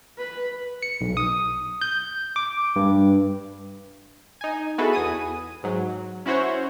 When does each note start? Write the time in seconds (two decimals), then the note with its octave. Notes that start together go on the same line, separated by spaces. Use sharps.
0.18 B4
0.83 C#7
1.01 B1
1.17 D#6
1.82 G6
2.36 D6
2.76 G2
4.41 D#4 G#5
4.78 B3 E4 F#4 G#4 A4 B4
4.93 E2 G#5 D#6 D#7
5.63 G#2 F#3
6.26 C#4 E4 F#4 C5 C#5